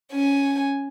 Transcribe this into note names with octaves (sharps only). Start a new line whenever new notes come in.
C#4 G#5